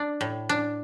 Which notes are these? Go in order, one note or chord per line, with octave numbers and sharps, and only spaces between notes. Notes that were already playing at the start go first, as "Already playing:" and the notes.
Already playing: D4
A2
D4